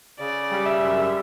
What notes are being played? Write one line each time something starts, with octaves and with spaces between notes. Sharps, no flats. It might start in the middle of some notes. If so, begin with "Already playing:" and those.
C#3 D5
G3
E5
F#2